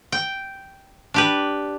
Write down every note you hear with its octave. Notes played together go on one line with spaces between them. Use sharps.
G5
D4 G4 B4